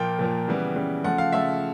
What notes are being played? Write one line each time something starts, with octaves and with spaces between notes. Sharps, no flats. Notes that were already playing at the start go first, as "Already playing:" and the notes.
Already playing: A#2 F3 A#3 G5
A#2 F3 A#3
C#3 E3 G3 B3
C#3 E3 G3 B3
C#3 F3 A3 F#5
F5
C#3 F3 A3 E5